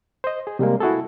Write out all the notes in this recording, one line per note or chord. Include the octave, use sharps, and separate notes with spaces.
C5 D#5
G#4
C3 G3 G#3 A#3
E4 F#4 G#4 A4